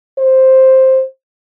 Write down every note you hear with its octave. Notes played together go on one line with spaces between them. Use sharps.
C5